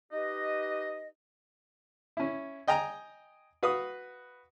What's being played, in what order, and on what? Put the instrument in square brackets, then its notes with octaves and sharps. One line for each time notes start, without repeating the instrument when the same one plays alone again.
[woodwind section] D#4 G4 B4 D#5
[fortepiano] C#4 E4
D#5 G5 G#5 A#5
F#4 B4 F5 D#6